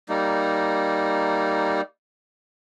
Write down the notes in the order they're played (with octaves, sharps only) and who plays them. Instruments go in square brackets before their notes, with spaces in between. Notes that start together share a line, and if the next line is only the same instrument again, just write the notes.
[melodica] G3 A#3 D#4